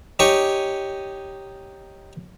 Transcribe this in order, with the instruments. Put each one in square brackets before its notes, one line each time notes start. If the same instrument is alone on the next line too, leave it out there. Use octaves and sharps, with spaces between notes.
[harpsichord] D#4 G4 C#5 G#5 C#6